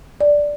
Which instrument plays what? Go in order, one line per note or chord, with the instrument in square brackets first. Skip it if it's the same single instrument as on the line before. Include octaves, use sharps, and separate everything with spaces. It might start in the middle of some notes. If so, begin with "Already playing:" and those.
[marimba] D5